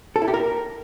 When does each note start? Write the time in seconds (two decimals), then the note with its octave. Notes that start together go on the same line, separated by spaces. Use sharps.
0.16 A4
0.22 E4
0.28 G4
0.34 A#4